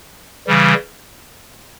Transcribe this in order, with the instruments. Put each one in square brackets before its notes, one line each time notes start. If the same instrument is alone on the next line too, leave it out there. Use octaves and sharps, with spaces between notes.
[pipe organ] C#3 E3 G3